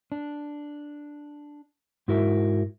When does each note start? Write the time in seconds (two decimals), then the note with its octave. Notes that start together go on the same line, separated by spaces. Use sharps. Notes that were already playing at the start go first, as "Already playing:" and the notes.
0.12 D4
2.08 G#2 E4 F#4 A#4 E5